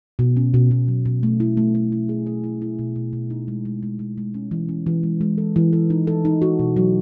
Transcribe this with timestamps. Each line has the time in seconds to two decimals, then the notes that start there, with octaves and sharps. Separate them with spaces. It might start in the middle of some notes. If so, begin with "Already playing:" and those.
0.19 B2
0.37 C#4
0.54 B2
0.71 B2
0.88 F#3
1.05 B2
1.23 A3
1.40 E4
1.57 A3
1.75 A3
1.92 E4
2.09 G#4
2.27 G#4
2.44 E4
2.62 E4
2.79 B2
2.96 B2
3.13 B2
3.30 D#4
3.48 G#3
3.65 G#3
3.83 G#3
3.99 G#3
4.18 G#3
4.34 C#4
4.51 E3
4.69 C#4
4.86 E3
5.03 G#3
5.21 G#3
5.38 A4
5.56 E3
5.73 A4
5.90 D#4
6.07 A4
6.25 D#4
6.42 F#4
6.59 B2
6.77 F#3